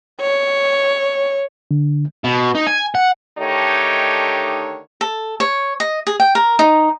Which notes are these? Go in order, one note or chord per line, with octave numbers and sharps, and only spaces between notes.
C#5
D3
B2
D#4
G#5
F#5
D3 D#3 A3 D#4 G4 C#5
A4
C#5
D#5
G#4
G5
A#4
D#4